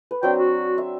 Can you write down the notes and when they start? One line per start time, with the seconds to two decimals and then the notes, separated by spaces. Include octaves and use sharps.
0.11 B4
0.23 F#3 C4 D4 G5
0.38 F#4
0.78 E5